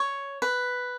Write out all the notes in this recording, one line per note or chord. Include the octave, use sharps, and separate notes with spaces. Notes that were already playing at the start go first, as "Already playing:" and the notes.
Already playing: C#5
B4